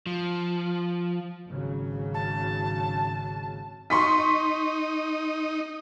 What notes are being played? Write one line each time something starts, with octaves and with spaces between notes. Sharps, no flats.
F3
G#1 C#3 F#3
A5
D#4 C6 C#6 B6